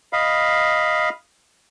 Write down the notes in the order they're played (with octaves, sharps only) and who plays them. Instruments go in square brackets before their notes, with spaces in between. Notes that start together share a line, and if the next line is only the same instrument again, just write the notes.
[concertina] D#5 F5 B5